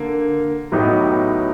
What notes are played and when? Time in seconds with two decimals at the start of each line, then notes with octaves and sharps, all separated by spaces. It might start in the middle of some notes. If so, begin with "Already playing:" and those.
Already playing: D3 A#3
0.72 A2 F#3 B3 D#4 G4